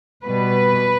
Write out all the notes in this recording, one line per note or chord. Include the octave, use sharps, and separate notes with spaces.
B2 G3 B4